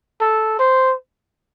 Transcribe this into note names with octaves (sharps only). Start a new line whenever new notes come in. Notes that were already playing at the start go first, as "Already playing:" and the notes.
A4
C5